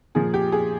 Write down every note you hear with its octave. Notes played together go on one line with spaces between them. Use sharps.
A#2 F3 G#4
G4
G#4